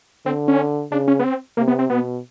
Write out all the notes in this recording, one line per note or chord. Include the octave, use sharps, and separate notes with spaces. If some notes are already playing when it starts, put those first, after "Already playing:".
D3 C4
C#4
C#3 D4
C#4
B3
C4
C3 A#3
B3
C4
B2 B3